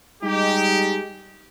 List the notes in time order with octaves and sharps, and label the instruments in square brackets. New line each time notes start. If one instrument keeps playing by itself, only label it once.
[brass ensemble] G3 G#3 D#4 G4